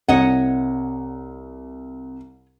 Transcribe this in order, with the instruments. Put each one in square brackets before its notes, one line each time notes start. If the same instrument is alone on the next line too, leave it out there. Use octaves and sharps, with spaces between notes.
[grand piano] C2 [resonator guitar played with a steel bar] C#5 D#5 F#5